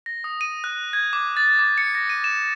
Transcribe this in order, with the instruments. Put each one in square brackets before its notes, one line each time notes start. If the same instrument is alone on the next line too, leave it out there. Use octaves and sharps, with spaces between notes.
[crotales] A#6
D#6
D#7
F#6
G#6
D6
A6
D6
C#7
A#6
D#7
E7